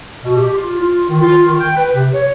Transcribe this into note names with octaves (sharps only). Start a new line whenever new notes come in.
B2
G4
F4
F4
D#3
F4
D#3
G5
B4
C3
C#5